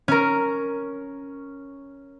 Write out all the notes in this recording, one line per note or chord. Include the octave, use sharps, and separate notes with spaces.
C#4 A#4